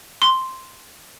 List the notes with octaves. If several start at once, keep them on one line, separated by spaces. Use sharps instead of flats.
C6